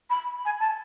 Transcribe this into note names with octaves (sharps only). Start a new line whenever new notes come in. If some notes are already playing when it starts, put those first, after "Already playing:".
B5
G#5
A5